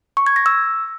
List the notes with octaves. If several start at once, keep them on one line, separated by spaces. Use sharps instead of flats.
C#6
G#6
A#6
E6